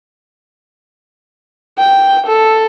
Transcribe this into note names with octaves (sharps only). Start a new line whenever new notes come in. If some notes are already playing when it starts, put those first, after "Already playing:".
G5
A4